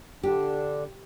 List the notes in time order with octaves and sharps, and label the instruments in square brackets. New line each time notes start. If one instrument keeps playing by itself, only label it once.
[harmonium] D3 D4 [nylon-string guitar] G4